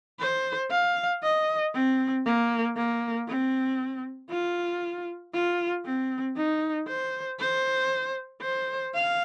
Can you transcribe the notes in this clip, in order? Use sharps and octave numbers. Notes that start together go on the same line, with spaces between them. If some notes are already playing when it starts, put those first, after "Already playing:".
C5
F5
D#5
C4
A#3
A#3
C4
F4
F4
C4
D#4
C5
C5
C5
F5